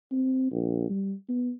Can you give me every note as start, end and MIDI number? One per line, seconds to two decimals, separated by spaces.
0.12 0.51 60
0.52 0.90 34
0.90 1.14 55
1.29 1.52 59